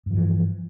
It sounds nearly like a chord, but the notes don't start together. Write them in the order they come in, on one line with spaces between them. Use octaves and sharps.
G2 F3 E3